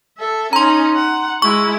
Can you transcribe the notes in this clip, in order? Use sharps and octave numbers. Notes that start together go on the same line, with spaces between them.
A4 E5
C#4 D#4 A#5 C6
F#5
G#3 E4 C#6